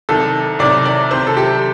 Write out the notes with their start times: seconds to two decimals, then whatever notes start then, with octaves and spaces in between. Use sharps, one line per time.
0.09 C2 C3 D#3 A4
0.59 C2 C3 D#3 D5
0.85 D5
1.11 C2 C3 D#3 C5
1.27 A4
1.37 G4